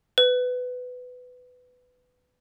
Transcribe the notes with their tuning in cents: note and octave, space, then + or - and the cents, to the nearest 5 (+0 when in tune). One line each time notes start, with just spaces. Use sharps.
B4 +15